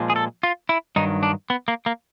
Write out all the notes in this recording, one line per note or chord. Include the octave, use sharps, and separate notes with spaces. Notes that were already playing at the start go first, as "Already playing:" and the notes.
Already playing: A#2 F3 G#3
G#4
A4
F4
E4
G2 D#3 F#3 D#4
D4
B3
A#3
A#3